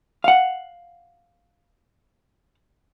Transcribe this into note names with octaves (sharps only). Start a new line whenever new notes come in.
F5 F#5